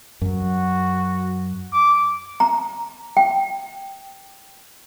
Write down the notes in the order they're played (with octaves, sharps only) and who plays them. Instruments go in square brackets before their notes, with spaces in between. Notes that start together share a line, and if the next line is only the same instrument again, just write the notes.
[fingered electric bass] F#2 F#3 [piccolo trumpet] F#4
[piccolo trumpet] D6
[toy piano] A#5
G5